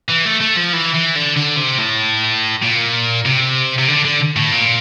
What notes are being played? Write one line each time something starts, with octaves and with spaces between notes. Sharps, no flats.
E3
A3
A3
F3
E3
E3
D3
D3
C3
A2
A#2
C3
C3
D3
D3
A2
A#2